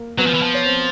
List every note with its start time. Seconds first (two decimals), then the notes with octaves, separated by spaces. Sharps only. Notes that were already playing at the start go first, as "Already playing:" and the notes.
Already playing: A#3 A#4
0.18 F#3 B3 B4
0.26 F3
0.34 E3
0.42 F3
0.54 C#5
0.65 C4 C5